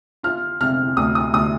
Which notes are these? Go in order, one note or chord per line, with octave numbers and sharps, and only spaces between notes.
F4 F6
C3 F6
D2 D#6
D#6
D2 D#6